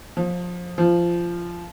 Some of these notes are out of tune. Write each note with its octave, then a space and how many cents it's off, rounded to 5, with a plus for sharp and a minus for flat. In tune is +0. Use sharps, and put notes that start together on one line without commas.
F3 +20
F3 -15